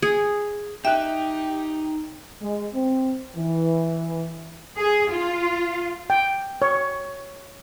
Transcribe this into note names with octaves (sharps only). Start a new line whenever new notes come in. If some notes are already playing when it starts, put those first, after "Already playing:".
G#4
D#4 G4 E5 G5 F#6
G#3
C4
E3
G#4
F4
G5
C#5